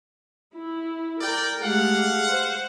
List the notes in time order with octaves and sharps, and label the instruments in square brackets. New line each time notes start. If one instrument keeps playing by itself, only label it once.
[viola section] E4
[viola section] A#4 [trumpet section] D5 G5
[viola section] G#3 A3 G4 [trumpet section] F5 F#5
[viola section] C5